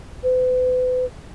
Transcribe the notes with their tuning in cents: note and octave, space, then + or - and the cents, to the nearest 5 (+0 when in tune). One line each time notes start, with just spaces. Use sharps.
B4 +40